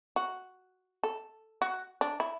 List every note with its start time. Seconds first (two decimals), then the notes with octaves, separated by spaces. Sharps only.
0.16 F#4
1.04 A4
1.62 F#4
2.01 D4
2.20 E4